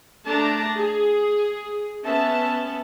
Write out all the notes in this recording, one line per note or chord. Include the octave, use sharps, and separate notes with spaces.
A3 D4 A5 A#5
G#4
B3 C#4 E5 A5